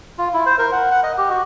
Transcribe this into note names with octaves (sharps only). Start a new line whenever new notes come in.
F4
E4
C5
A#4
F#5
F#5
D#5
G4
F#4